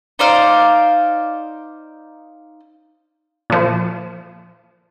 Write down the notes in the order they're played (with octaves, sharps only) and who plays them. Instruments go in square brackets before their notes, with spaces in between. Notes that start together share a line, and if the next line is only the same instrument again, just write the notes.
[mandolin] D#4 C5 D5 F5
[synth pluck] A#2 F3